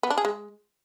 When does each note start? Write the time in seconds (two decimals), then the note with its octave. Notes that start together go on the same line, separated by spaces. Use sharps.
0.03 B3
0.10 D4
0.18 G#4
0.25 G#3